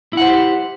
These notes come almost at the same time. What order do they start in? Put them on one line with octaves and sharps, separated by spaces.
E4 F#5 C5 G4